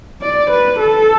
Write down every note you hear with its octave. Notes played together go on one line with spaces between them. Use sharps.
D5
B4
A4